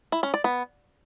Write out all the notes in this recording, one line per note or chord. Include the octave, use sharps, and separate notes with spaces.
E4
C#4
D5
B3